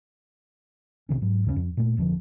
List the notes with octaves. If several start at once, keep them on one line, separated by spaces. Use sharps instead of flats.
B1 C3 D#3 C#4
G#2 F#3
D#2 C#3 A#3 C#4
F2
A#2 A3
F#1 F2 D3 F3